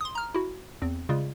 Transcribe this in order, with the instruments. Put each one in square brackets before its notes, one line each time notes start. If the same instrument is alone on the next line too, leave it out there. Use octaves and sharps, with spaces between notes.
[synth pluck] C6 D#6
A#5 F6
E4 F#4
E2 C4
C#3 G3 G#3 F4